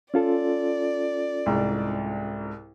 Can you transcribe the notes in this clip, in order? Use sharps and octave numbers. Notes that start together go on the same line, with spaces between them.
C#4 F4 A4 D5
C2 G#2